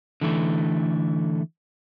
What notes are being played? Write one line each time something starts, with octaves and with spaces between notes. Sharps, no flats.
D3 E3 A3